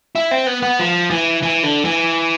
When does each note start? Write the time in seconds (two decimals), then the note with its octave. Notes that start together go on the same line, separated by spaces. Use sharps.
0.15 E4
0.31 C4
0.47 B3
0.62 B3
0.79 F3
1.10 E3
1.43 E3
1.63 D3
1.85 E3